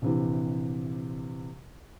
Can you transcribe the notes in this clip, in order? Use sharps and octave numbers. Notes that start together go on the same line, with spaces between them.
A#1 C3 E3